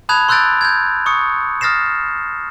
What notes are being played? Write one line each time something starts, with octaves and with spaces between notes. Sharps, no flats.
A5 B5 D#6 F#6 G#6 F7
C6 E6 F#6 G6 A6 D7
G6 G#6
C#6 D#6 C#7
D#6 F6 A6 A#6 C7 E7